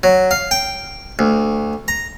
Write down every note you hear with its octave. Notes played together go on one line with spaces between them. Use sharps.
F#3
F5
G5
D2
A#5